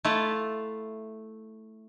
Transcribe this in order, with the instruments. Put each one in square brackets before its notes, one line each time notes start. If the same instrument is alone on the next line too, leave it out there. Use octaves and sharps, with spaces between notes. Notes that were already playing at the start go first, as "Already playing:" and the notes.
[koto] A3 E4 F4 F5